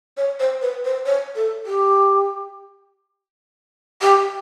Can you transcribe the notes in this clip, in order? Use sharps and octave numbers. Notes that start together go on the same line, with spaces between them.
C#5
C5
B4
C5
C#5
A4
G4
G4